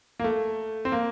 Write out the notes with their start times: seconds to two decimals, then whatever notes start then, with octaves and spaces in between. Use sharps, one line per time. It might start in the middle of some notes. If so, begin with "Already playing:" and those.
0.20 A#3
0.24 A3
0.85 C4
0.92 A#3